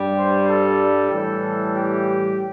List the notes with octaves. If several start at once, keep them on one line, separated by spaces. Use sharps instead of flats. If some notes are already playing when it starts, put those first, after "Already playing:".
Already playing: G2 G3
C5
A4
A2 E3 G3
G4